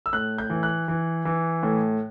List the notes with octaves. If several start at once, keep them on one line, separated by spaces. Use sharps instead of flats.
E6
A2 F#6
G6
E3
F#6
E3
E3
A2